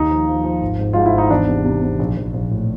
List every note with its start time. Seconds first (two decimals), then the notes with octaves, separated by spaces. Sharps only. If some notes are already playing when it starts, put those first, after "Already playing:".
Already playing: D#2 D#4
0.10 F3
0.28 F3
0.44 F3
0.61 G#1
0.79 G#2
0.93 G#2 F4
1.06 E4
1.13 G#1 D#4
1.30 E2 D4
1.47 C3
1.65 C3
1.82 C3
1.99 A#1
2.17 A#1
2.34 A#1
2.51 A2